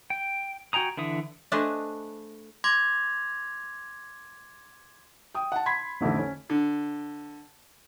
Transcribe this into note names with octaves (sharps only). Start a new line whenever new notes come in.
G5
F#4 G5 G#5 A#5 D#6
D3 E3 E5 D#6
A3 D4 G#4 B4 C5 D#5
C6 D6 G#6 A#6 F7
G5 D#6
F#5 A5
B5 C6 G#6 B6
A1 F2 D3 A3
C#4
D3